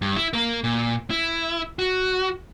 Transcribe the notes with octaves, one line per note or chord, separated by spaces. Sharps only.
G2
E4
A#3 A#4
A#2
E4
F#4